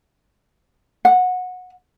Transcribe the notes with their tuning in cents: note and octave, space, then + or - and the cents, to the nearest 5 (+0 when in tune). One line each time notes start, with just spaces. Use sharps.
F#5 -20